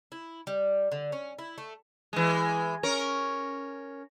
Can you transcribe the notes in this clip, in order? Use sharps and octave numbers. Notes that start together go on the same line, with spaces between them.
E4
G3
D3
C#4
E4
A3
E3 G#3
C#4 A#4